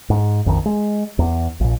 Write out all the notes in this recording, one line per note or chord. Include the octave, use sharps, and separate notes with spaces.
G#2
A#1 F2 D#3
G#3
E2
A#1 A#2